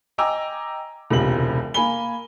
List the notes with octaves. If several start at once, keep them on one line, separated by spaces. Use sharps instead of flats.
D#5 G5 G#5 A#5 D6 E6
E1 C#2 C3 F#7
A#3 G#5 B5 G7